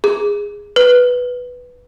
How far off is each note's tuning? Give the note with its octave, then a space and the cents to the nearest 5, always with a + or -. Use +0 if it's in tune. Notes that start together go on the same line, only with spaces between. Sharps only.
G#4 -15
B4 +0